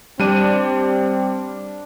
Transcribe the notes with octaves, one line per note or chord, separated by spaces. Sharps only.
G3 C4 D4 D#7